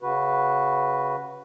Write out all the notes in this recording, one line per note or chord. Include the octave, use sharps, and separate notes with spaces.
C#3 F#4 B4